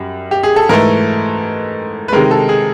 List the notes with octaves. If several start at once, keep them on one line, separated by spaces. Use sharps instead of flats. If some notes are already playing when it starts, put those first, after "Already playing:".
Already playing: F#2 G3
G4
G#4
A4
G#2 E3 A3 A#4
B4
C3 D#3 G#3 A#4
A4
G#4